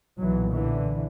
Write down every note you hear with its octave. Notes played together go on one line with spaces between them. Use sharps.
B1 A#2 E3 F#3
D3 E3